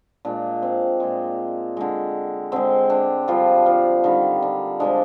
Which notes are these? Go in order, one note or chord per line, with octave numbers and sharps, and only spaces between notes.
A#2 G#3 D4
C4
A#2 G#3 D4
D3 G#3
D3 G#3 C4
D4
D3 F3 G3 F4
F3 F4
D3 D#3 G3 D#4
D4
D3 F3 G#3 D4